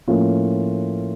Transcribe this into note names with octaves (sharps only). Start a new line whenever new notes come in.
A2 F3 A#3 C#4 F4